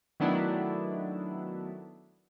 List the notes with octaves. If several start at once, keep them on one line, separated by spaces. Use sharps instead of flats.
D#3 F#3 A3 B3 D4 E4